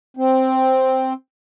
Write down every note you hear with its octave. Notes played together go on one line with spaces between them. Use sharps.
C4